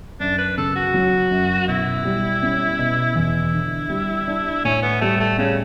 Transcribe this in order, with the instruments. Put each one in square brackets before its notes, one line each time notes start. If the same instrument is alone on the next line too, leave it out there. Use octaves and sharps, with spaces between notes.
[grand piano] F#2 [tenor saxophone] D4
[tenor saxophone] B4
[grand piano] C#3 [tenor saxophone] A4
[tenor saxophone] F#4
[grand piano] F#3
F#2
[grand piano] B2 [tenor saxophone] E4
[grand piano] G3
C#4
B2
[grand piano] E2 [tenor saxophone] E4
[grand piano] D3
G3
D4
[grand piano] A2 [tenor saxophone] C#4
[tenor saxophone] B3
[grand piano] G3 [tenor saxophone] A3
[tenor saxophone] A3
[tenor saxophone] C#3 [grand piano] C#4